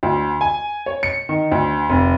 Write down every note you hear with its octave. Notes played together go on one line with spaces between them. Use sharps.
D2
G#5
C#5
C#7
D#3
D2
F1